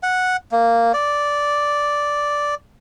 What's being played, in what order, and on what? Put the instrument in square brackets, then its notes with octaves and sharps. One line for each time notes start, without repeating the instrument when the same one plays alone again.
[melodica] F#5
A#3
D5